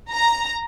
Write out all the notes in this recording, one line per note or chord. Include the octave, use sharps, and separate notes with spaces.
A#5